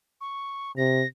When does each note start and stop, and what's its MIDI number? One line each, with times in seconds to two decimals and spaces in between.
0.21 0.72 85
0.77 1.04 48
0.77 1.07 94